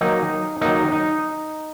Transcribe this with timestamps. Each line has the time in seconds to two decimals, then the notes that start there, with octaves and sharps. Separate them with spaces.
0.01 D#3 F#3 A#3 D#4
0.61 D#3 F#3 A#3 D#4
0.92 D#4